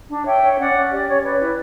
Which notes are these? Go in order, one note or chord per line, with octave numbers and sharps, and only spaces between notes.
D4
C#5 E5 G5
C#5
C#4 D5 F#5
C#4
G4 D5
C#4 C#5
B4 D5
E4